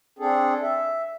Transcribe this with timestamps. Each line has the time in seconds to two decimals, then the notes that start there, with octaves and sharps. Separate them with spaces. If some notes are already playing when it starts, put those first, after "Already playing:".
0.19 C4 D4 G#4 A4
0.62 E5